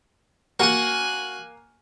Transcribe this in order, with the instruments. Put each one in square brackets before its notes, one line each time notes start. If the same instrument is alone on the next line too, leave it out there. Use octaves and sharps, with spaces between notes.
[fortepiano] A#3 [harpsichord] F#4 F#5 [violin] G#5 F#6